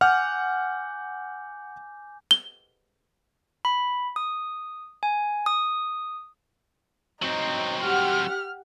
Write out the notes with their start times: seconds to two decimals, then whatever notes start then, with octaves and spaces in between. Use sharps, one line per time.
0.01 F#5 G#5 D6 F6 G6
2.31 G7
3.65 B5
4.16 D#6
5.03 G#5
5.46 D#6
7.22 F#3 C4 D#4
7.83 G4 F#5 F6